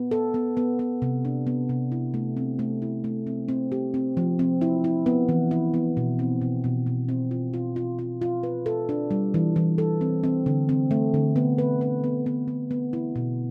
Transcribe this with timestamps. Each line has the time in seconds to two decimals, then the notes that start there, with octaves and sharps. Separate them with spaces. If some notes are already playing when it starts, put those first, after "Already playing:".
Already playing: B3
0.11 A4
0.34 B3
0.57 B3
0.79 B3
1.02 C3
1.25 D4
1.47 B3
1.69 C3
1.92 E4
2.14 A3
2.37 C4
2.59 A3
2.82 E4
3.04 A3
3.27 C4
3.48 C4
3.72 G4
3.94 C4
4.17 F3
4.39 C4
4.61 E4
4.84 E4
5.06 B3
5.29 E3
5.51 E4
5.74 B3
5.97 B2
6.19 C4
6.41 B2
6.64 B2
6.86 B2
7.09 C4
7.31 F4
7.54 F4
7.76 F4
7.99 F4
8.22 F4
8.43 B4
8.66 A4
8.89 D4
9.11 G3
9.34 E3
9.56 E3
9.78 A4
10.01 C4
10.24 C4
10.46 D3
10.69 C4
10.91 A3
11.14 D3
11.36 B3
11.58 B4
11.81 B4
12.04 B3
12.26 B3
12.48 B3
12.71 B3
12.93 E4
13.16 B2